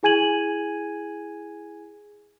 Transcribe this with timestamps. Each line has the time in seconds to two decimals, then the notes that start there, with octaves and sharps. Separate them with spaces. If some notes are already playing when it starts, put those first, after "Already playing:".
0.03 E4 G#4 G#5 G#6 D#7 F#7